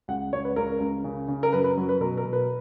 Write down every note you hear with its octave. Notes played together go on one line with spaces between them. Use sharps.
C#2 F#5
C#2 C#5
B4
C#2 A#4
C#2
C#3
C#3
A#4
F#2 B4
B4
F#3
B4
B2 A#4
A#4
B2
B4